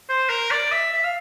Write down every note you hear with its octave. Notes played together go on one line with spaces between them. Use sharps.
C5
A#4
D5
E5
E5
F5